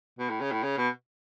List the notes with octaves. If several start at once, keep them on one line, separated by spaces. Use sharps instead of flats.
B2
A2
C#3
A2
C#3
B2